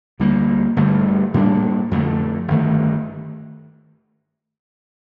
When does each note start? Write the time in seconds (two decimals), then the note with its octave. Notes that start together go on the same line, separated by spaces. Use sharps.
0.20 D2 D3 G3 A#3
0.77 G1 G2 D3 A3
1.34 A2 G3 A#3 D4
1.91 F2 D3 A3
2.48 G1 G2 D#3 A3